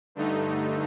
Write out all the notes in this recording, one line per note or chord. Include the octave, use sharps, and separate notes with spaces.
G2 D3 A3 D#4